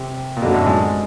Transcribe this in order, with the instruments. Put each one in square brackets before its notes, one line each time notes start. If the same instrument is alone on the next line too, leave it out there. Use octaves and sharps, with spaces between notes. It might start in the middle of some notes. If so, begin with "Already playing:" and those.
Already playing: [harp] C3
A#2
[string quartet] F#2 D3 F#3 [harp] B2
[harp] A2
G#2